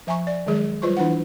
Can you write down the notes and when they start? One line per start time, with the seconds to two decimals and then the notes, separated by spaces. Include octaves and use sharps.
0.07 F3 E5 G#5 A#5 C#6
0.27 D5
0.46 D#3 F#3 G#3 G#4
0.82 F#3 G3 F4 B4 C5 C#6
0.97 E3 D4 E4 F#5